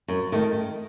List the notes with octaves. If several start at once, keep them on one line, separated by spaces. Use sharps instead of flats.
F#2
D#3 A3